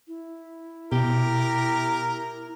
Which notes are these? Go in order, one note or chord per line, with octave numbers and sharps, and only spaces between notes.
E4
B2 G4 A#4